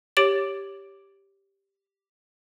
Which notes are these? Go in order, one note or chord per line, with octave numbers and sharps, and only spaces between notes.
G4 C#5 D6 A6 D7 F#7